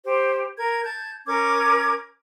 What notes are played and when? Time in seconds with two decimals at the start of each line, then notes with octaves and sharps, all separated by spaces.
0.05 G4 C5
0.57 A#4 G#6
0.84 A5 G6 G#6
1.26 C#4 A#4 D6 G#6